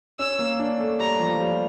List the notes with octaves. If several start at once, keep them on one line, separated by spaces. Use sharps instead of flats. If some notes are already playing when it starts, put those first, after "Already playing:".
C#4 E6
A#3
D4
A3
G3 A#5
F3
F3
G3